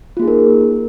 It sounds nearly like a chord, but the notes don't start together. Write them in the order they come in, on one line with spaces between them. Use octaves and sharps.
F4 A#3 G#4 D#4 A#4